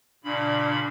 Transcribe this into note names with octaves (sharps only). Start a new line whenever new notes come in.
A#2 C#3 D4 B5